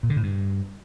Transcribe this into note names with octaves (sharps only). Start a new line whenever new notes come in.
A#2
D3
A2
G2